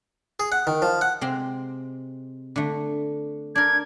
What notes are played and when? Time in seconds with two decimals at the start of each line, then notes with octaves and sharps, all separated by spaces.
0.40 G#4
0.52 F#5
0.67 D#3
0.82 F3
1.01 F#5
1.21 C3 G#3 C4
2.56 D3 A3
3.55 D4 A#4 G#6